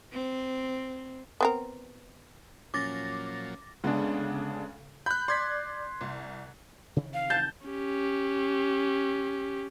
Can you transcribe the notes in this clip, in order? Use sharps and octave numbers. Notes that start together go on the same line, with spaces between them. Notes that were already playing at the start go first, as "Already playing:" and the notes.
C4
B3 C4 A#4
A#2 F3 F#3 C#4 D6 A6 A#6
D2 C#3 G#3 B3 D4
B5 F#6 G6
D5 C6 G#6 B6
C2
C3 D#3 E3
F5
A5 G6
C#4 G4